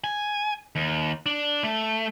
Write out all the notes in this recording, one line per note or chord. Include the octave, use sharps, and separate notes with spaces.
G#5
D#2
D4
A3